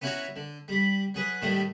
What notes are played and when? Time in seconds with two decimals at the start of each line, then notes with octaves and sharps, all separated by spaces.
0.02 B3 C#4 E4 F#4 C#5 A#5
0.36 D3
0.68 G3 B5
1.14 F#3 G#4 B4
1.42 D#2 A2 D#3 G3 A3